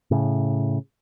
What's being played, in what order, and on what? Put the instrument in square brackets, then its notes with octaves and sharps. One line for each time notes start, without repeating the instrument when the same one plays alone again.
[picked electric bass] A2 C#3